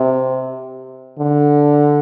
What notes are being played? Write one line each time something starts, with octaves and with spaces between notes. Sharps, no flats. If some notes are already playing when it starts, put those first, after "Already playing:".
Already playing: C3
D3